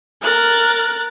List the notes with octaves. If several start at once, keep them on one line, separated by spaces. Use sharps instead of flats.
A#4 F#6 A6